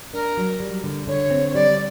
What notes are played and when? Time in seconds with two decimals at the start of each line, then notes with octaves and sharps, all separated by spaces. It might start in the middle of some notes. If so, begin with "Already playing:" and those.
0.13 D4 A#4
0.37 F#3
0.60 G3
0.84 D3
1.07 D3 C#5
1.31 C4
1.49 C#5
1.54 G3 D5